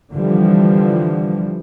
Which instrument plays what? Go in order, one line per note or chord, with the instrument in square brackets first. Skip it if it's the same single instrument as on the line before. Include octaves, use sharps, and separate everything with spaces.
[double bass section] D3 E3 F3 G3